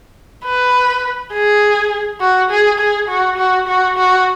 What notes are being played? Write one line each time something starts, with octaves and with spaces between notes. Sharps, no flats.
B4
G#4
F#4
G#4
G#4
F#4
F#4
F#4
F#4